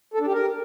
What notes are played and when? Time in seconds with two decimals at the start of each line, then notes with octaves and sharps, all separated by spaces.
0.14 A4
0.20 D4
0.27 G4
0.33 A#4